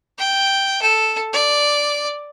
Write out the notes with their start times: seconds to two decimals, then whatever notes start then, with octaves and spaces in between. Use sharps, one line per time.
0.18 G5
0.82 A4
1.33 D5